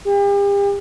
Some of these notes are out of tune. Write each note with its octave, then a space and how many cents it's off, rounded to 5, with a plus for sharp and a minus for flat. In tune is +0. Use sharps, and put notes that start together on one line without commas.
G4 +40